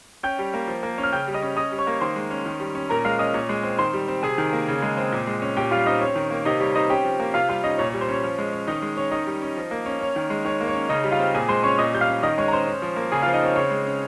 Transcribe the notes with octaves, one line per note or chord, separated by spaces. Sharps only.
C#4 G5 G6
G3
A#3
F3
A#3
C#4
F6
C#3 G5 G6
G3
D#5 D#6
C#4
C#4 D#5 D#6
G3
C#5 C#6
A#3
D#3 C5 C6
G#3
C#4
D#3
G3
C#4
A#2 A#4 A#5
G#3 F5 F6
C#4 D#5 D#6
A#2 C#5 C#6
G#3
C4
D#3 C5 C6
G3
C4
C3 G#4 G#5
D#3
A#3
C#3
G#3
C4
A#2
G#3
C#4
A#2 G4 G5
G3 F4 F5
C4 D#4 D#5
C#4 C#5
D#3
A#3
C3 D#4 D#5
G3 C#5
C4 D#4 D#5
C#4 G4 G5
F3
A#3
C3 F4 F5
G3 F4 F5
C#4 D#4 D#5
A#2 C#5
C#5
G3
C5
C#4 C#5
F3
G#3
C#4
D#3 D#4 D#5
G#3
C#4 C#5
D#3 D#4 D#5
G3
C#4
F3
A#3
C#4
C#4 C#5
D#3
G#3
D#3 C#5
A#3
C#5
C#4
C#3 D#4 D#5
G3
F4 F5
C4
A#2 G#4 G#5
G#3 C5 C6
C#4 C#5 C#6
A#2 D#5 D#6
G3 G6
F5 F6
C#4
D#3 D#5 D#6
G#3 C#5 C#6
A#5
C#4 C5 C6
C#4
F3
A#3
C#3 G#4 G#5
F4 F5
F3
D#4 D#5
C4 C#5
C#3 C#5
G#3
C#4